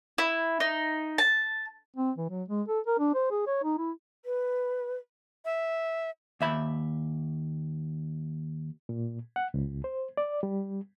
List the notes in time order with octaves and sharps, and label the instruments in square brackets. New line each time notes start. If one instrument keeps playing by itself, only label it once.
[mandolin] E4
D#4
A5
[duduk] C4
E3
F#3
G#3
A4
A#4
D4
C5
G#4
C#5
D#4
E4
[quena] B4
[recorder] E5
[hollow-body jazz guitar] D#2 E5 B5
[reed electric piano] A#2
F#5
C#2
C5
D5
G3